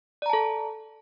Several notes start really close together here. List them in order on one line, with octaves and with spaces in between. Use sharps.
D5 A#5 A5 A4